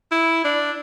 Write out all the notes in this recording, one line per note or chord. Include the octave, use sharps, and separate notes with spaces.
E4
D4